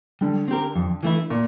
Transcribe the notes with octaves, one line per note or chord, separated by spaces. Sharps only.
D3 G3
C4 G4 A#4
F2
E3 A3 E4
A#2